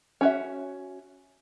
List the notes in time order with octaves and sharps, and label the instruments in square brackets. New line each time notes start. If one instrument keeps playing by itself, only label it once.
[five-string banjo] C#4 F#4 E5